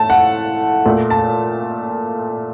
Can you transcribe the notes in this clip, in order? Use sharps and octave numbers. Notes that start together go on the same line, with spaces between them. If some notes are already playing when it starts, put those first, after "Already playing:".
Already playing: A2 A3 A5
F#5
A#2 A3
A5